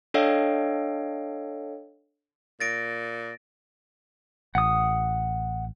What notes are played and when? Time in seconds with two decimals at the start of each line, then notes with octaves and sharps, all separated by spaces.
0.14 D4 A4 C#5 D#5 F5 G5
2.60 A#2 A6 A#6 D7
4.55 A1 F#5 D#6